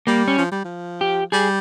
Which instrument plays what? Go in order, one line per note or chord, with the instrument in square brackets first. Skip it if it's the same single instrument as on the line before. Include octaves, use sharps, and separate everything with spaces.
[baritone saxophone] G3 [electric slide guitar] A#3
[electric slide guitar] C#4
[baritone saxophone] F3
G3
F3
[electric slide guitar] G4
[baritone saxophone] G3 [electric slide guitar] G#4